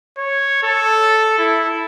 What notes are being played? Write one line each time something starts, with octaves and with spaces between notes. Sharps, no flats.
C#5
A4
E4